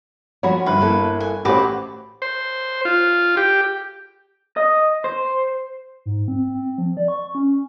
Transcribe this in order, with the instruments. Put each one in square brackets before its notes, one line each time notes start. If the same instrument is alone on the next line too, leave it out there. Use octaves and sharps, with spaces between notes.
[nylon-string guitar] F3 F4 F#4 [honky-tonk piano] C#5 F#5 B5
[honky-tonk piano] G1 F#6 [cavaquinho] B4
[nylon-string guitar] A#3 E4 A4
[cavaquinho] G#5
[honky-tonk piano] A1 C5 [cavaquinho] F#4 B4 D6 [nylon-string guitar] G4
[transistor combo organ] C5
F4
G4
[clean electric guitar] D#5
C5
[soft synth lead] G#2
C4
C4
F3
D5
C#6
C#4